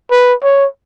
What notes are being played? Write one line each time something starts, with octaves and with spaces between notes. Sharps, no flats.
B4
C#5